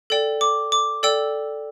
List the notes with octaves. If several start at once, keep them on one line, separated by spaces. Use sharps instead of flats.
A4 D5 G5
D6
D6
A4 D5 G5 E6